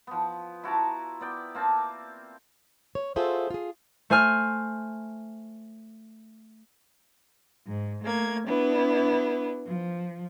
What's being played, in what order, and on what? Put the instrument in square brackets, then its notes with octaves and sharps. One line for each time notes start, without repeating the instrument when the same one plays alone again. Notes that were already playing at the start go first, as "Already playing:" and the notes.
[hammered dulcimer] F3 B3
E4 F#4 A5 A#5
B3 D5 G5
A#3 C4 A5
[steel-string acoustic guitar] C#5
F4 F#4 G#4 A4 C5 E5
F4 G#4
[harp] A3 C5 G#5 F6
[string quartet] G#2
A3 A#3 G#6
B3 D4 E4
F3